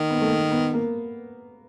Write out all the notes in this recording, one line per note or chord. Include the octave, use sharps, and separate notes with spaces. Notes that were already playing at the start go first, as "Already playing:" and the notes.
Already playing: D#3 A#3
B3
A3
A#3
B3
A#3